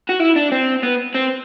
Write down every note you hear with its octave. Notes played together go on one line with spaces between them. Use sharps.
F#4
E4
D4
C4
B3
C4